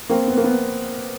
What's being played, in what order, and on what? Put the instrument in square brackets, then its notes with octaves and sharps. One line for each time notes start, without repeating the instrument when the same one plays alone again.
[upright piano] A#3 C4
B3
A#3
B3